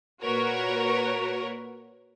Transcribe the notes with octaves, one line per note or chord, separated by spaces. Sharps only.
A#2 F#4 A#4 B4 C#5